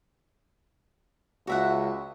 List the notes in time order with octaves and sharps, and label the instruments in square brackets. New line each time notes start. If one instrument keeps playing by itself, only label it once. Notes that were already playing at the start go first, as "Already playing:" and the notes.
[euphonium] C#2 [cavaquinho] F#4 E5 F#5